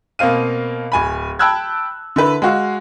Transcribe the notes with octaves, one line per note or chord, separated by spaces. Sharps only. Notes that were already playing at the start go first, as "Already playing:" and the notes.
B2 A#3 C4 F5 D#7
D1 G#5 B5
G5 A5 B5 E6 F#6 G#6
D3 E4 B4
G#3 F#4 F5